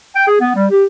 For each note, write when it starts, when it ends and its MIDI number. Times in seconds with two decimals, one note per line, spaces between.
0.15 0.26 79
0.28 0.37 68
0.41 0.53 59
0.56 0.65 55
0.71 0.84 67